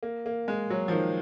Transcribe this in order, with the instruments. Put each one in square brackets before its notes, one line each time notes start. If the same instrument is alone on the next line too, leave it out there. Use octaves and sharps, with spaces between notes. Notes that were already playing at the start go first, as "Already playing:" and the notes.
[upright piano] A#3
A#3
G#3
F#3
F3
D#3